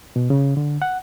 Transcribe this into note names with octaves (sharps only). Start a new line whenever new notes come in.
B2
C#3
D3
F#5